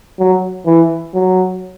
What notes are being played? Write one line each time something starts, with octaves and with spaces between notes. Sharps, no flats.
F#3
E3
F#3